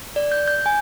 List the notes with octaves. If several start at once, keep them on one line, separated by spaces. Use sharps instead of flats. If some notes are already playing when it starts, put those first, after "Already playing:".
D5
G6
G6
G#5